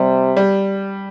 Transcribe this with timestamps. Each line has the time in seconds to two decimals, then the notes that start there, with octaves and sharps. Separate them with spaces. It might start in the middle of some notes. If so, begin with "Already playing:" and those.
Already playing: C3 G3
0.37 G3